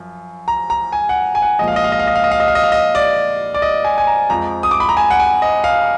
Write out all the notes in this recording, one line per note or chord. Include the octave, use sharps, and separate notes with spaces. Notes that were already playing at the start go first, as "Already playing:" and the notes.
Already playing: F#2 F3
A#5
A#5
G#5
F#5
G#5
F#5
A#2 F3 G#3 D#5
F5
D#5
F5
D#5
F5
D#5
F5
D#5
F5
D#5
F5
D#5
F5
D#5
D5
D5
D#5
G#5
G#5
A#5
F2 F3 G#3 A#5
D#6
D6
B5
A#5
G#5
F#5
G#5
D#5
F5